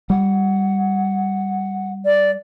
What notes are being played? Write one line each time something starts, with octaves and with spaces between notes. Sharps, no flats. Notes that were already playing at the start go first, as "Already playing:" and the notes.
G3 F#5
D5